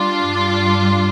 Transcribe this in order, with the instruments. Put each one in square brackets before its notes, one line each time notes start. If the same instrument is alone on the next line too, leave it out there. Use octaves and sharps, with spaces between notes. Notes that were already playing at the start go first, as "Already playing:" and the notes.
Already playing: [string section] G3 D4 F4
[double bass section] G2